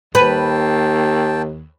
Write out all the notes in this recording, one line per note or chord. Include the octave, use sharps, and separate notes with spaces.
D#2 B4 G5 A5